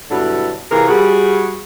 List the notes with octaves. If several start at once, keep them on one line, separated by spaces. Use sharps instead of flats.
G2 B2 D3 F#3 E4 A4
C3 E3 F4 G#4 A#4
G3 F#4 G#4